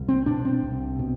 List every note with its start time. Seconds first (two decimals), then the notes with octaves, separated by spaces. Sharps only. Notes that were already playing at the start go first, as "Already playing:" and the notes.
Already playing: C2
0.09 C4
0.26 B2 D4
0.45 C4
0.63 C2
0.99 B2